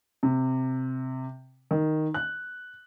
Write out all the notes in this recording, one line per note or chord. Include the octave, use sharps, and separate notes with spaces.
C3
D#3
F#6